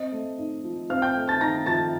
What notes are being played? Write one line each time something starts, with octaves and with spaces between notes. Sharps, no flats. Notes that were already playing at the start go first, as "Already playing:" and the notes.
Already playing: C4 D#5
A3
D#4
F3
C4 F5 F6
G5 G6
A3
A5 A6
D#4 A#5 A#6
F3 A5 A6